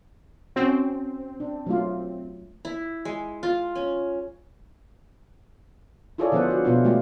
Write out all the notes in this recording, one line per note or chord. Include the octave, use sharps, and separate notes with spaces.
C4 C#4 F#4
D4
F#3 A3 F4
E4
G#3
F4
C#4
E4 F4 G#4 A4 C#5 D5
D3 F3 B3 D4 C5 F#5
F#4
B2 B3 F4
G#3 A3 F4 G4